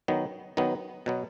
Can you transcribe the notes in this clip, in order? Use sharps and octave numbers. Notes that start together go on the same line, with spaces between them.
D#3 F#3 B3
D#3 F#3 B3
B2 F#3 B3